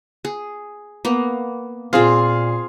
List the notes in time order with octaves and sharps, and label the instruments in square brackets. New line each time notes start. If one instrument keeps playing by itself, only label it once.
[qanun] G#4
A#3 B3
[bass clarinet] A#2 [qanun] C4 F4 [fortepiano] G#4 F5